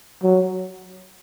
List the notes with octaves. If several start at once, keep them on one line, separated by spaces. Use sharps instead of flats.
F#3